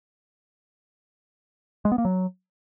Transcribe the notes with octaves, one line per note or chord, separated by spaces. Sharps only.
G#3
B3
A#3
F#3